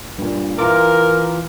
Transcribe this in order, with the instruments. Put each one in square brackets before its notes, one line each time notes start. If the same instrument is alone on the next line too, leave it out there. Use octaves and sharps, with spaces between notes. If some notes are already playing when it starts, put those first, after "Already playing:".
[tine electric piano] G2 A#2
[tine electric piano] E3 F4 D6 [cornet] A#4